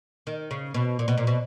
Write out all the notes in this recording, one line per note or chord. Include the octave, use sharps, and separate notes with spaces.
D#3
C#3
B2
A#2
B2
A#2
B2